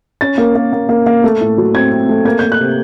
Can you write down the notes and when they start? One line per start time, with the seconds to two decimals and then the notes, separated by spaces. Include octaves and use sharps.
0.21 C#4 A6
0.38 A#3
0.55 A#3
0.73 A#3
0.89 A#3
1.06 A#3
1.24 A3
1.41 A2
1.58 F#3
1.74 C4 G#6
1.91 C4
2.09 A3
2.25 A#3 G#6
2.39 A#3 G6
2.52 F#6
2.60 C3